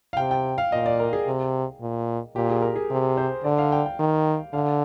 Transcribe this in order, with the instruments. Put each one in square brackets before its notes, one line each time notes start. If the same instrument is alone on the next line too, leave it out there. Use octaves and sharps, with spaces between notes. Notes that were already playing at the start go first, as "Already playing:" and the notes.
[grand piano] F5
[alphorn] C3 [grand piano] G5
[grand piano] G5
F5
[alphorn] A#2 [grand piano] D#5
[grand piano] D5
A#4
G#4
[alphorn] C3
A#2
[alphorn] A#2 [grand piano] G4
[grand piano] G#4
A#4
G#4
[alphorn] C3
[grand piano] C5
[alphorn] D3 [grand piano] D5
[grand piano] F5
G5
G5
[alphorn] D#3
[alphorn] D3 [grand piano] F5